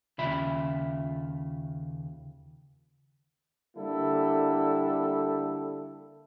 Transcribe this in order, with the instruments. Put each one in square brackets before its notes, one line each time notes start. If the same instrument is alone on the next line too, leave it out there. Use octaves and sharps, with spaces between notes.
[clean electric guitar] D#2 C#3 F4 E5 B5
[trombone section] D3 G3 A#3 E4 A4